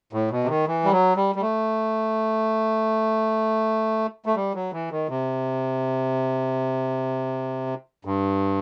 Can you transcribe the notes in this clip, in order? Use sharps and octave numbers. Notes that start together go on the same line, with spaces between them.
A2
B2
C3
D#3
E3
G3
F#3
G3
G3
A3
A3
G3
F#3
E3
D#3
C3
G2